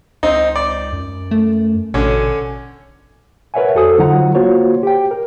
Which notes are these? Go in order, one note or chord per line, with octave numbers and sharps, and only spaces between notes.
C#2 C4 D#4
D5
F#2
A3
A1 B2 D3 C#4
A#4 B4 C#5 E5 F#5 G#5
F2 F#4 A4 C5 D#6
D3 F#3 D#4 F4 F#5 A#5
A#3 F4 F#4 C5 C#5
G4 G5
A#4